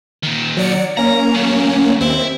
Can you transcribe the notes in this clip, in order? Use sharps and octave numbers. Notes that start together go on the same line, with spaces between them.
A#2 D#3
F#3 D5 C#7
A#3 C#4 A#5
F#3 A3
D#2 C4 E4